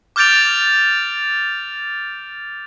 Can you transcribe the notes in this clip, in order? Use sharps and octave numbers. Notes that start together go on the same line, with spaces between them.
D6 F6 G6 A6 D7 F7